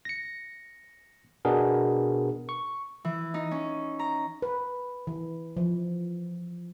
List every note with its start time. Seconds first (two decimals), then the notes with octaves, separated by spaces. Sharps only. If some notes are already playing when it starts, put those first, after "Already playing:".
0.05 A#6 C#7
1.45 B2 B3 D4 G#4 A#4
2.49 C#6
3.05 E3
3.34 D#4
3.51 C#4
3.99 A#5
4.42 B4
5.07 E3
5.57 F3